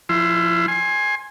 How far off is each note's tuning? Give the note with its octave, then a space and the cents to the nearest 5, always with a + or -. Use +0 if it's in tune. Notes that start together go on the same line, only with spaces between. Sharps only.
F3 +0 E4 +25 C6 +0
G#5 +0 C6 +25